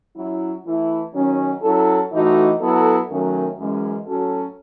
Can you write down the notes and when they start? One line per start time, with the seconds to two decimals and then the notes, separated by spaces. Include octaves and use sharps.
0.15 F#3 C#4 E4
0.64 E3 A3 E4
1.13 D#3 F#3 C#4
1.62 F#3 C#4 E4 A4
2.11 A2 E3 A3 D#4 F#4
2.59 F#3 B3 E4 A4
3.09 F#2 D#3 F#3 A3 C#4
3.57 F#2 E3 G#3 C#4
4.06 A2 F#3 C#4 F#4 A4